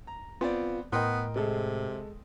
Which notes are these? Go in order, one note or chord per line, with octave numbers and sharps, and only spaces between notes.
A#5
B3 C4 F4 D5
A2 B3 A#4 D#5 G5 C6
C3 G#3 G#4 A4